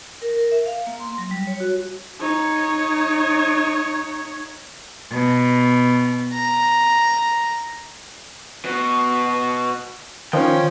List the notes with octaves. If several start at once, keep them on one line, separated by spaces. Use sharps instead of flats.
A#4
A#4
E5
F5
A#3
C6
F#3
G3
C#5
F#4
D#4 C#5
B2
A#5
B2 F#4
D#3 F3 C#4 G5